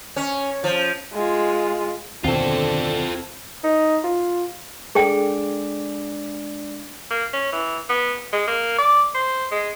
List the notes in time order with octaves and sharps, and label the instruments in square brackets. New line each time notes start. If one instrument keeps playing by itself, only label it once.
[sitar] C#4
F3
[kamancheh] G#3 F4
[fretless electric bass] D#2 B2 [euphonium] D3 [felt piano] C4 C7 [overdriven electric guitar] F4 A4
[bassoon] D#4
F4
[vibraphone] G#3 D4 D5 [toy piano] G#4 A4 G5
[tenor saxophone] A#3
C#4
E3
B3
G#3
A#3
D5
C5
G#3